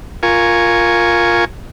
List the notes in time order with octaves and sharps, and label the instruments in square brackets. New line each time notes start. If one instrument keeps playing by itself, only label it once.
[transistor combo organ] F4 A#4 G#5 C#6